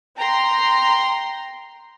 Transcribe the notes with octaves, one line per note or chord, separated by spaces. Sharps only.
G5 A#5 C6